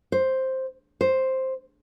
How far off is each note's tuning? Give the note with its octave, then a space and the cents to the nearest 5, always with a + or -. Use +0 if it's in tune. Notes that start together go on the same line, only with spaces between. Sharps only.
C5 +5
C5 +5